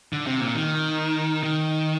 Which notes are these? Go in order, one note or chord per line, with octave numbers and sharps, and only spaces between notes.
D3
C3
A#2
D#3
D#3